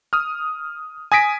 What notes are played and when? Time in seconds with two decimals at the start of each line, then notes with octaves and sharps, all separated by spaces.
0.13 D#6 F6
1.12 G#5 D#6 A#6 B6 D7